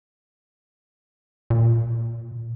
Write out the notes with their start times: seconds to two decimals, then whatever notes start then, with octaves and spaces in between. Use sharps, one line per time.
1.50 A#2